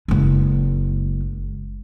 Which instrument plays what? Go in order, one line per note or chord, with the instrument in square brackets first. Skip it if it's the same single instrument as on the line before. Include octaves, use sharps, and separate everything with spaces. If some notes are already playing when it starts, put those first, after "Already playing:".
[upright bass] F#1 G#3